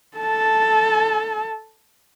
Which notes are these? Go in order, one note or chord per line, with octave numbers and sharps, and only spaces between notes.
A4 A5